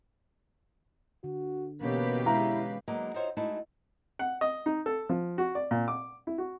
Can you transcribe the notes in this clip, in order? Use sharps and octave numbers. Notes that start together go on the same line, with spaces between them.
D3 F#4
B2 E3 A#3 C#4 G4 B4 C#5
G#3 E4 F5 A#5
D3 F#3 G#3 A#3 B3
D#4 F4 F#4 C5 C#5 E5
G#3 A3 D#4 E4 F#4 A4
F#5
D#5
D#4
A4
F3
F#4
D5
A#2
D6
E4
F#4